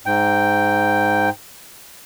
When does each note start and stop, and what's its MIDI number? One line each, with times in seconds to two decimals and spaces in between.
0.06 1.29 44
0.06 1.29 79